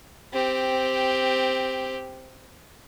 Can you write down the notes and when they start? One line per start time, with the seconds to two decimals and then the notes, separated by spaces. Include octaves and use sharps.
0.33 C4 G4